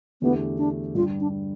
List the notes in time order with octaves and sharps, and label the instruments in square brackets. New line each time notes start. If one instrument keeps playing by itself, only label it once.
[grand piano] E2 D3 A3 E4 G4 [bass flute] B3
[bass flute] D4
[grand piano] G2 D3 G3 [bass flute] F4
[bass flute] D4